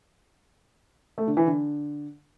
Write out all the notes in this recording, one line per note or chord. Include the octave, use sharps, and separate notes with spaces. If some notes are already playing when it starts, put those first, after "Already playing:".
A3
D3
E3
D3